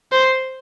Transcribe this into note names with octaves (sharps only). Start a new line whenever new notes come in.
C5